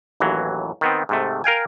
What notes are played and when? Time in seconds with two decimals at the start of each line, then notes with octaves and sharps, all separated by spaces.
0.20 A1 D#2 E3 F#3
0.81 D#3 B3 C4
1.09 G#2 C3 A3
1.44 A#4 F5 G5 G#5